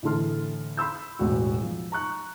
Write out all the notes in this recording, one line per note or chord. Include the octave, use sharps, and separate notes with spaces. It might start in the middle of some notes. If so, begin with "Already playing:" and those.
A2 D3 E3 A4 C6 F6
B5 C6 E6 G6
E1 A1 F#4
F3
A#5 C#6 F#6